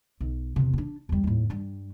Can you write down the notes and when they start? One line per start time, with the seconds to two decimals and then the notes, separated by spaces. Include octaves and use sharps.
0.20 B1
0.56 E2 C3
0.73 C4 D4
1.09 E2 G3
1.24 D#2 A2
1.50 G2 G3